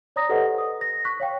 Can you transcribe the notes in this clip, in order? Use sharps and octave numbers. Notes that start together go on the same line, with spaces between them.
C#5 D5 A#5 D#6 A#6
G4 A4 B4 C5 D#5 F#5
D#6
A#6
C#6 F#6 B6
C#5 F5 G5